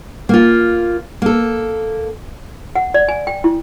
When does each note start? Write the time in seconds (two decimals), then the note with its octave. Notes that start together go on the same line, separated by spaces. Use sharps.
0.29 A#3 F4
1.22 A#3 A4
2.75 F#5
2.94 D5
3.08 G#5
3.27 G5
3.44 E4